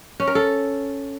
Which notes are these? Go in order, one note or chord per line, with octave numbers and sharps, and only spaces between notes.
C#4
A#4
A4